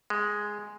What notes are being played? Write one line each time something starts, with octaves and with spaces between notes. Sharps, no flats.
G#3